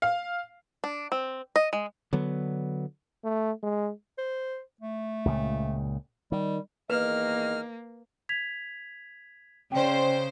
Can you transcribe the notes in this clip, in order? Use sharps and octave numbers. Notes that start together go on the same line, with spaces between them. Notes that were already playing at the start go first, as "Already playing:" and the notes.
F5
D4
C4
D#5
G#3
D3 F#3 B3
A3
G#3
C5
A3
C#2 A#2 C#3
D#3 G3
E2 D#3 A#3 B4 D#5 F6
G#6 B6 F7
C#3 C5 D5 G5